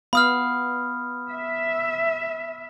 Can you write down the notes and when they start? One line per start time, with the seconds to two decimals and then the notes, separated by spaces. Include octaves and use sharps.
0.13 B3 F5 B5 D#6 F6
1.29 E5